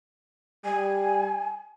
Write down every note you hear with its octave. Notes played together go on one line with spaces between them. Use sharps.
G3 G#5